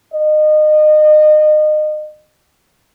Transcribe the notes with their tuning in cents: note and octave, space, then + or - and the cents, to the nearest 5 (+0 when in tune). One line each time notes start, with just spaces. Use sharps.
D#5 -30